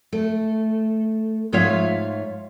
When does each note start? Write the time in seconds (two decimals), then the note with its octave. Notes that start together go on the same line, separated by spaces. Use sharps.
0.13 A3
1.52 G#2 F3 F4 C#5 E5 F5